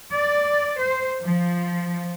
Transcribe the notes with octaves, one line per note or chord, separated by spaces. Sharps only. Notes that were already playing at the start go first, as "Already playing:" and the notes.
D5
C5
F3